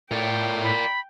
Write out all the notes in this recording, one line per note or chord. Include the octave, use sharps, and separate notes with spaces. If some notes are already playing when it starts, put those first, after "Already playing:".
A2 A#4 D5 G5
B5